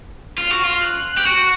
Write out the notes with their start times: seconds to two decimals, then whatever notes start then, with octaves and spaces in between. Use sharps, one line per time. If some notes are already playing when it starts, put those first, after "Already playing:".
0.38 F4 F6
0.51 F#4
0.64 F4
0.81 F#6
1.17 G4
1.26 F#4